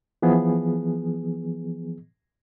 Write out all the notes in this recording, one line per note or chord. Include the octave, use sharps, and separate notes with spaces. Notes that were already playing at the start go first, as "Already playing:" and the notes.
E3 F3 B3 G#4